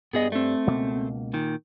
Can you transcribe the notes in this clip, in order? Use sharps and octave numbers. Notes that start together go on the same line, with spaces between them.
G2 B3 G#4 D#5
A3 C4
C#2 B2 A#3
A#2 D#3